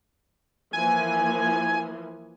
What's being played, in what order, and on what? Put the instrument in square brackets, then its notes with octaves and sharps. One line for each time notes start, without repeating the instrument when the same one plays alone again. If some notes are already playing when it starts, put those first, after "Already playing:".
[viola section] E3 F3 A#3 [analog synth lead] G#5